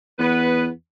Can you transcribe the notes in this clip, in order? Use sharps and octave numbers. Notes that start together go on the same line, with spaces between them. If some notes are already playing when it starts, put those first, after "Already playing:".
E2 B3 B4